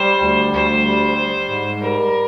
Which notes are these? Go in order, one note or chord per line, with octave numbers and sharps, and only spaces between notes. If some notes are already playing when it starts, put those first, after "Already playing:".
Already playing: G3 C5
D2
D2 C5
G3
G3
G#2
G3 A#4